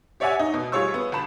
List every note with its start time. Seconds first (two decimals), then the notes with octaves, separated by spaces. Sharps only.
0.20 G4 C#5 D5 E5 F#5 G#5
0.40 D#4
0.54 B2
0.72 G3 F4 G#4 C#5 C#6 E6
0.94 B3
1.12 G1 A5 B5 E7